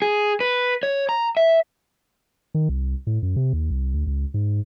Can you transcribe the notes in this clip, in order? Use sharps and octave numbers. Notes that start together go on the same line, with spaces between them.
G#4
B4
C#5
A#5
E5
D#3
C2
A2
F#2
C3
D#2
C2
D2
C#2
G#2